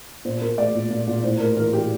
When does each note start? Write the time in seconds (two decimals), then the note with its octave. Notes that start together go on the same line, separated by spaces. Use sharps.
0.25 A#2 C5
0.42 A#2 A#4
0.58 A3 D5
0.75 A#2
0.90 A#2
1.07 A#2
1.23 A2 C5
1.40 A3 A#4
1.57 E3 A#4
1.73 E3 G4